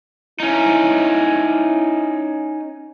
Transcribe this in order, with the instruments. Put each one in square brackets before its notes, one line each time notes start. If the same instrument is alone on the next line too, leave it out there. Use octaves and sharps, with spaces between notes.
[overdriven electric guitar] C#4 D#4 [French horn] E4